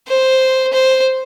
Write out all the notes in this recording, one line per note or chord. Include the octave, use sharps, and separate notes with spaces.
C5
C5